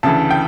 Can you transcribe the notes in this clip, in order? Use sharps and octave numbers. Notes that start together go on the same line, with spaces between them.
D2 C#3 E3 A5
G5